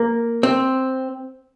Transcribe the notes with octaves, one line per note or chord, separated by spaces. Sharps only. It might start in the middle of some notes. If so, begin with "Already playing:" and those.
Already playing: A#3
C4